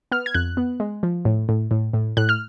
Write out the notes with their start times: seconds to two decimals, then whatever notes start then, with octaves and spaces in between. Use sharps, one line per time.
0.11 B3 F6
0.26 G#6
0.34 F2 F#6
0.57 B3
0.80 G#3
1.03 F3
1.25 A2
1.49 A2
1.71 A2
1.94 A2
2.17 A2 F#6
2.29 F6